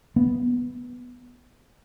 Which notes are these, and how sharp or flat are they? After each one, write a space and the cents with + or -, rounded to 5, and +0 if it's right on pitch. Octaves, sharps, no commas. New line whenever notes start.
B3 -5